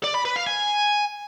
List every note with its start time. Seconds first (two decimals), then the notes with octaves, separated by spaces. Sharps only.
0.04 D5
0.15 B5
0.25 B4
0.36 F5
0.47 G#5